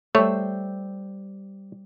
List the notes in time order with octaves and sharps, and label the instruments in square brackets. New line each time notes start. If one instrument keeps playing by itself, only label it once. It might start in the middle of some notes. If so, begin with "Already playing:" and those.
[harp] G3 C5 E6 [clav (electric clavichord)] A3 C#5